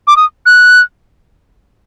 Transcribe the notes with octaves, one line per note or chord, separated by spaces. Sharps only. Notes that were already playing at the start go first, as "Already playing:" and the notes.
D6
D#6
F#6